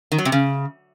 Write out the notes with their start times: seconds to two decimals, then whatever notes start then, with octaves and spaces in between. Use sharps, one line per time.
0.12 D#3
0.18 F#3
0.25 C3
0.32 C#3